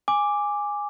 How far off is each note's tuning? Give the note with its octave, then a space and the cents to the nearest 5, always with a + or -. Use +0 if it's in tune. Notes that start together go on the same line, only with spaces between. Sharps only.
G#5 -10 D6 +0